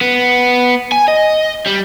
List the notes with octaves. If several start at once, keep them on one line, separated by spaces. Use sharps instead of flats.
B3
G#5
D#5
G3